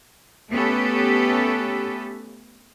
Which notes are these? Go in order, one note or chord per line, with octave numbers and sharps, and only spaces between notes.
A3 B3 C#4 G4 A4 B4